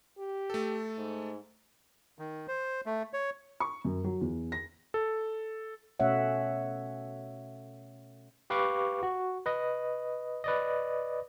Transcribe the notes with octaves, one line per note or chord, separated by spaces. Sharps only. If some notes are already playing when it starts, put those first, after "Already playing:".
G4
A3 A4
G#2
D#3
C5
A3
C#5
C#6
F#2
F#3
E2
A#6
A4
B2 A3 C#4 C#5 E5 F#5
G4 B4 F5 C#6 D6
F#4
B4 D#5
B4 D5 D#5